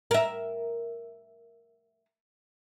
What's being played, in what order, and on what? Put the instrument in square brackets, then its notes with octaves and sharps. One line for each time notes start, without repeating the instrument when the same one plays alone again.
[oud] A#4 E5